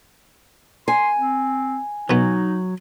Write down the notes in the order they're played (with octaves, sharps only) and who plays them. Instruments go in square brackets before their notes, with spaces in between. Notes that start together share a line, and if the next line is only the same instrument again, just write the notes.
[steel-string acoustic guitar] G#5 [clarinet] C6
[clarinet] C4
[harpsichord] B2 B3 [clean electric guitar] F#3 [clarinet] D#4